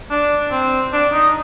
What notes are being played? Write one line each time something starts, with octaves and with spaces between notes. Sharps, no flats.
D4
C4
D4
D#4